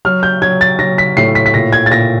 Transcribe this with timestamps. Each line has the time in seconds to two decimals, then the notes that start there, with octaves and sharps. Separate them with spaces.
0.05 F#3 F6
0.23 G6
0.42 F#3 G#6
0.61 A6
0.79 F#3 A#6
0.98 B6
1.17 A2 C7
1.35 B6
1.46 B6
1.54 A#2 A#6
1.73 G#6
1.86 A6
1.91 A#2 A#6